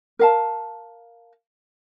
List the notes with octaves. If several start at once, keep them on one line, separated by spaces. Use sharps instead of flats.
A#4 F5 A5